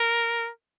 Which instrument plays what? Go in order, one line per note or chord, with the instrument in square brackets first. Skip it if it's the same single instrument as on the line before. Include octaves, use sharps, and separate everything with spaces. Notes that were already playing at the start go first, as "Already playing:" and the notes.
Already playing: [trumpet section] A#4